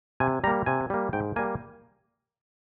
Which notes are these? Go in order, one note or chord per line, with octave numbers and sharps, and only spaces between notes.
C3 G#5
G3 A#3 A#5
C3 G#5
G3 A#3
G#2 G5
G3 A#3 G#5